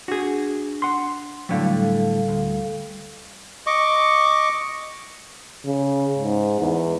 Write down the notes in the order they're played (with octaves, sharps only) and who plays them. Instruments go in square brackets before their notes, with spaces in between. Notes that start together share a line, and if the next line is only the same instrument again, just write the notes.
[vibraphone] D4 [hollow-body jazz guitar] F#4 G#4
[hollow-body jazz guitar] F#5 C6
[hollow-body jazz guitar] A2 D3 F#3 [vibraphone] G3 A4 F5
[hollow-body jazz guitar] D2
[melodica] D#5 C#6 D6
[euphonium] C#3
G#2
E2